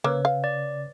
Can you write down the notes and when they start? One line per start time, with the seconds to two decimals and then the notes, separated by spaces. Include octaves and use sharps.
0.04 C#3 A#3 B4 C#5 E6
0.25 F5
0.44 D5